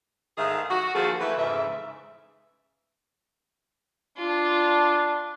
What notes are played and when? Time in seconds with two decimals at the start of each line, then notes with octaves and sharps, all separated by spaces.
0.38 G#2 D#3 A3 G#4 E5 F5
0.70 F#4
0.95 D#3 F3 A#3 F#4 G#4 A4
1.21 E3 A3 B4
1.38 F2 G#2 C#3 E3 E5
4.18 D4 F4